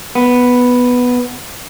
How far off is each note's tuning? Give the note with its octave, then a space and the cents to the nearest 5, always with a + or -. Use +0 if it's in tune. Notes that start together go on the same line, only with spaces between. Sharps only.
B3 +0